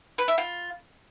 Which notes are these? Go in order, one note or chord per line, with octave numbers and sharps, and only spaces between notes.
B4
E5
F4